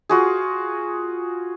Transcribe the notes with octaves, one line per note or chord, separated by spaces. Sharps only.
F4 F#4 G#4